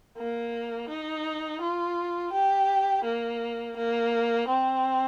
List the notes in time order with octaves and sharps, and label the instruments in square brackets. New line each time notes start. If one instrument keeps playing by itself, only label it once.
[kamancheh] A#3
D#4
F4
G4
A#3
A#3
C4